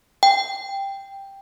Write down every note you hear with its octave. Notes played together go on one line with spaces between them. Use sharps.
G5